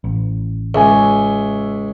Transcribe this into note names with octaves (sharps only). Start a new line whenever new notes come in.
A1
C#2 E5 G#5